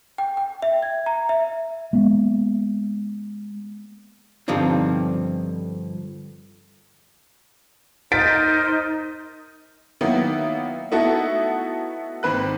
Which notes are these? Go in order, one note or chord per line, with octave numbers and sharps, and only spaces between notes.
G5
G5
E5
G#6
A#5
E5
G#3 A#3 B3
G2 D3 F3 C4 D#4
D#4 A#4 C5 A6 B6 D7
D#3 F#3 A#3 B3 E4
A3 B3 D#4 E4 F#4 A4
G#1 D#3 C4 B4 F#6